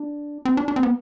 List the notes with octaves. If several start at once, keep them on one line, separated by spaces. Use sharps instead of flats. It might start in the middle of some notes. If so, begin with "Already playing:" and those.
Already playing: D4
C4
D4
D4
C4
B3